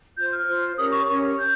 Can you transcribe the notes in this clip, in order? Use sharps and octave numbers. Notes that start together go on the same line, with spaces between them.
F4 C5 G6
F6
F4 C5
C#4 G4 A#4 C#5 D#6
C#6
C#4 G4 A#4 C#5 C#6
C#5 G6